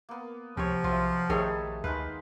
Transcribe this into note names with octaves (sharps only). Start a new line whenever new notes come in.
A#3 B3
C#2 C3 F3 C#5
B1 F#3 F4 E5
A#1 D#3 G3 A3 G#4 A4 C#5
D2 G#3 D#4 B4 F5